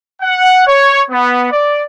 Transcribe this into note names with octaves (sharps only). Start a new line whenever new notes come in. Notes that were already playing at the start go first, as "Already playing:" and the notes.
F#5
C#5
B3
D5